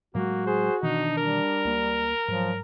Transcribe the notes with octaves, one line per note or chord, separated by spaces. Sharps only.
A2 F#3 G#3 A#3 F#4
G#4 C5
B2 D#3 E3 D4 D#4
G3 A#4
C#2 A#3
G#2 F3 F#3